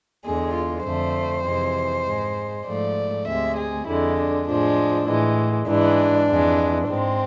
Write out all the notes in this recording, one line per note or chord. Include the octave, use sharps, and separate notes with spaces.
E2 D3 G#3 G#4
F4
F2 D3 A3 C5
F2 C3 E3 G#3
G#2 G#3
G#2 F3 A3 D5
D2 C3 G#3 E5
G#4
F2 D3 G#3 E4
D4
A2 F3 G#3 D4
A2 E3 G#3
G#2 E3 G#3 D4
F2 E3 G#3
G#2 G#3 C4